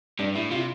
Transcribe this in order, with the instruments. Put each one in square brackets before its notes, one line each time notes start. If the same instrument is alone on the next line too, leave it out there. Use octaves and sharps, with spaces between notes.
[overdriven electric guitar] G2 [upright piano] D4
[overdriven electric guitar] A2 [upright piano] E4
[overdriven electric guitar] C3 [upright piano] F4